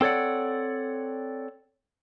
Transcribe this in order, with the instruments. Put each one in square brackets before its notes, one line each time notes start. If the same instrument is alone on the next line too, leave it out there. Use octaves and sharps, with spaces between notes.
[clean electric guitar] C4 A4 C#5 D5 F#5